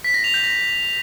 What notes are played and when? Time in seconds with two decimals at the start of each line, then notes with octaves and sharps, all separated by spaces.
0.04 B6
0.14 A#6
0.24 F7
0.34 G6
0.44 A#6